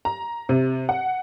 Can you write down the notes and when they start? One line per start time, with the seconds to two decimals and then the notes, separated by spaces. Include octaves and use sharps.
0.05 A#5
0.49 C3
0.89 F#5